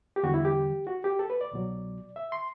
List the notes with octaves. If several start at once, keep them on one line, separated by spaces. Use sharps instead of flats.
G4
E2 D3 G3 F#4
E4
G4
F#4
G4
A4
B4
D5
C2 B2 F#3
E5
C6